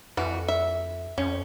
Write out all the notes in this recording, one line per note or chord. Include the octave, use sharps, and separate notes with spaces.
F2 E3 F#4
E5
F2 C#4